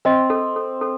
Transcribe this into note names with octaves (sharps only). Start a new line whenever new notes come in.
C4 D#5
A4
A4
A4